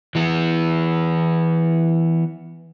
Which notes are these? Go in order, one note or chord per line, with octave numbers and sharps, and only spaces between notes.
E3 B3